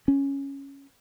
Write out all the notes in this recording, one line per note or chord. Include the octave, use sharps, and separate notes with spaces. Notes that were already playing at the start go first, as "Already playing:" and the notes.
C#4